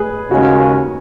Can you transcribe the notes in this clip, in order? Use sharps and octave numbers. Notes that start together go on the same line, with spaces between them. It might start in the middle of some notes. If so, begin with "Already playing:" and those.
Already playing: G#4 B4
D#2 C#3 G#3 C#4 F#4